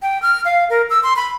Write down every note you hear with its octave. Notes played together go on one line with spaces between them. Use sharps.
G5
F6
F5
A#4
E6
C6
B5